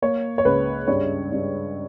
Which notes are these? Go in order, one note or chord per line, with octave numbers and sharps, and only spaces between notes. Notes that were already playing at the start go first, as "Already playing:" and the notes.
A#3 C#5
C#5
C#2 B4
G2 C#5
G2